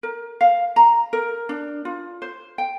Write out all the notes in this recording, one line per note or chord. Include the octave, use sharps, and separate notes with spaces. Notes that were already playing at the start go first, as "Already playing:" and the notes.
A#4
F5
A#5
A#4
D4
F4
C5
G5